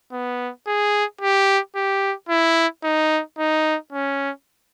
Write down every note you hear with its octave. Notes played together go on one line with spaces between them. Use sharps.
B3
G#4
G4
G4
E4
D#4
D#4
C#4